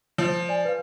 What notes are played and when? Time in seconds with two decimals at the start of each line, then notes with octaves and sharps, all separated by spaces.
0.18 F3
0.49 D5 G#5
0.65 B4 F5